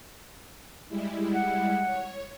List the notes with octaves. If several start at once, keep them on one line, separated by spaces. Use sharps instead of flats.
G3 G#3 E4
F#5
C#5